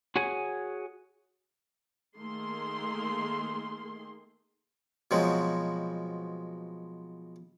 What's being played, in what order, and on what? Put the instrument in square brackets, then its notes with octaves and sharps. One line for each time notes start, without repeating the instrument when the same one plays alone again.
[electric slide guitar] F#4 G#4 C#5 G#5
[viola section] D#3 A3 A#3 G#4 C6
[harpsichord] B2 F3 F#3 G#3 B3 C4